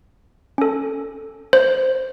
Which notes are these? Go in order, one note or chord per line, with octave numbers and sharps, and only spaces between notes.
C#4 A4
C5